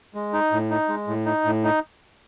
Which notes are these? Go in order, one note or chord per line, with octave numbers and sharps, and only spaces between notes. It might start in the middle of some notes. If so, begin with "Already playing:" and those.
G#3
D#4
A2
D#4
G#3
A2
D#4
A2
D#4